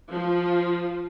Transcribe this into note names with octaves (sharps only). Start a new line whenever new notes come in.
F3